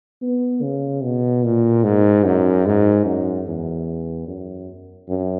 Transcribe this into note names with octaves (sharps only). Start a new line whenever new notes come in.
B3
C#3
B2
A#2
G#2
F#2
G#2
F#2
E2
F#2
F#2